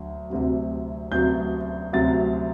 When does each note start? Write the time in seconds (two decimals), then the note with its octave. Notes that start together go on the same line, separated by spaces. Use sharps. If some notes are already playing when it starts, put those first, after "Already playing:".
Already playing: D2 F#3
0.30 D2 C3 F#3
1.11 D2 C3 F#3 G6
1.93 D2 C3 F#3 A6